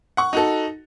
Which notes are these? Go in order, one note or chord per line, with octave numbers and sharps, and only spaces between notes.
F#5 C#6
D#4 F#4 A4